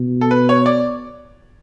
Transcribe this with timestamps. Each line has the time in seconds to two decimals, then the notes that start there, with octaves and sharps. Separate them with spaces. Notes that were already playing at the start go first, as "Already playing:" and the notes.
Already playing: B2
0.21 A4
0.31 B4
0.49 C#5
0.66 D5